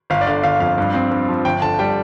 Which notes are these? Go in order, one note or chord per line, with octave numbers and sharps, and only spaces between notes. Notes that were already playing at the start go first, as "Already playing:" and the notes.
G1 F5
D5
D3 F5
G1 F5
F2 F5
G2
C4
G2
F3
G1 G5
D3 A5
G3 G5